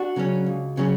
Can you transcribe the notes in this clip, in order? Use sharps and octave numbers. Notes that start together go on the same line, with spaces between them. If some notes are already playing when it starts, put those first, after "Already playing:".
Already playing: D4 F#4
C#3 F#3 C#4
C#2
C#3 F#3 C#4